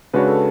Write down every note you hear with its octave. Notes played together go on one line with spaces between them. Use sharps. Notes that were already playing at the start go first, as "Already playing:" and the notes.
C#3 G#3 D4 F#4 B4 C#5
A4